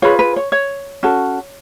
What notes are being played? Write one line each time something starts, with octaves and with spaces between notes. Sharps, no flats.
F4 G#4 B4 C#5
B4
C#5
C#5
C#4 F#4 A4